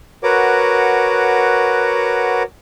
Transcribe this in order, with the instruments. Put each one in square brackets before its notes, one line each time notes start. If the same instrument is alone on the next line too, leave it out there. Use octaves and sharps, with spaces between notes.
[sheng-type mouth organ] F#4 A#4 B4 C#5 F#5 D6